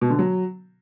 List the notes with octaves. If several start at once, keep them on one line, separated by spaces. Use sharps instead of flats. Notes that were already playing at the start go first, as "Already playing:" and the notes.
B2
D3
F#3